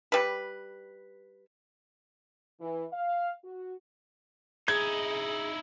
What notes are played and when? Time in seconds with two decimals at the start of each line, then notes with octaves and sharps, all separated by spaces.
0.12 G3 B4
2.60 E3
2.93 F5
3.44 F#4
4.68 D#4 E4 G#4 G#6